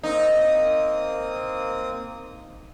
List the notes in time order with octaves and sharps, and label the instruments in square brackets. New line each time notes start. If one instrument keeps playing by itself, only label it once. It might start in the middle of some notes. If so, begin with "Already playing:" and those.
[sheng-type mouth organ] A#3 C4 D#6 [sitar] D#4